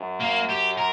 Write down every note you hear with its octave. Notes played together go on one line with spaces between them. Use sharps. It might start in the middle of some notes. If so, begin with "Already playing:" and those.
Already playing: F#2
A#3
G4
A#4